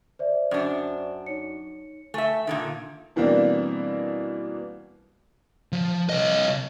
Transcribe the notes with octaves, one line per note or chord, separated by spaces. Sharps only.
C5 D5 E5
F#2 D4
D#4 C#5 C#7
A3 E5 G#5
A#2 D3 D#3
B2 E3 G3 A#3 C4 D4
F3
C2 D#5